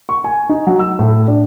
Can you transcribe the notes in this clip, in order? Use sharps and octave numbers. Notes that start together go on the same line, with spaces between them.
C#6
G#5
D#4
F#3
E6
A2
D4